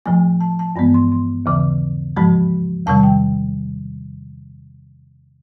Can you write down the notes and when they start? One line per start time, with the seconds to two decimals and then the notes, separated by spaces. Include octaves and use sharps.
0.06 A2 F3 A3 G#5
0.41 A5
0.59 A5
0.76 G2 E3 G#3 B3 B5
0.94 C6
1.12 C6
1.46 D#2 C#3 E3
2.16 G#2 F3 G#3 B5
2.86 E2 C3 D#3 G3 A5
3.03 G5